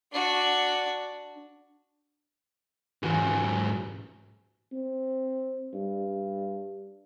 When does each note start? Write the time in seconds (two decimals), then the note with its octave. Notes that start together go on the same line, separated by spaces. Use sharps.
0.12 D4 F#4
3.03 C#2 G#2 E3 F#3 G#5
4.73 C4
5.74 G2